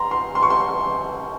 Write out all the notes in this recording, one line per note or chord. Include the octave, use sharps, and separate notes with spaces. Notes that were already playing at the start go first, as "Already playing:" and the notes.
Already playing: A#5 C6
C6
C6
C#6
C6